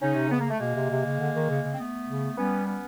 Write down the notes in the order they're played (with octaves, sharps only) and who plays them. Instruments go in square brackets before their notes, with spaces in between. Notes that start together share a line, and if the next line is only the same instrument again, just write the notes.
[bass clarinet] C#3 [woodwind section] C#4 D#4
[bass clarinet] C3
[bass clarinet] C#3 [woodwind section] B3
[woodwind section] A#3
A3
[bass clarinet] B2 [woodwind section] G#3 A#3
[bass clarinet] C3
C3
C#3
D3
D#3
C#3
C#3
[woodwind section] C4
A3 B3
[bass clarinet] C#3
[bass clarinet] G3 [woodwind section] B3 C#4
[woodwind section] B3 C#4